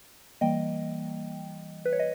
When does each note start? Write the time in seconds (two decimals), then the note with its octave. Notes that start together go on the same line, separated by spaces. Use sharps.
0.41 E3 G3 A#3 D#5 G5
1.85 B4
1.93 C#5
2.00 D#5